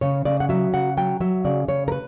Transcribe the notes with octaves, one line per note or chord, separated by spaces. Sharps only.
C#3 C#5
C#3 D5
F#5
F#3 E5
C#3 F#5
F#3 G5
F#3 E5
C#3 D5
C#3 C#5
A#4
B4